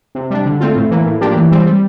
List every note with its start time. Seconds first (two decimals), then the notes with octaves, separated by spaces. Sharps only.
0.15 C3
0.30 G3 D4
0.46 D3
0.60 A3 C4 F4
0.76 A2
0.91 E3 A#3
1.06 A2
1.21 F3 A#3 D4 G4
1.36 E3
1.51 G3 C4
1.66 G3